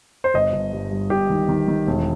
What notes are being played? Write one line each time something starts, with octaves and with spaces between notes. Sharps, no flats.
C5
G1 D#5
G1
G2
G2
G2 G4
D#3
D#3
D#3
E1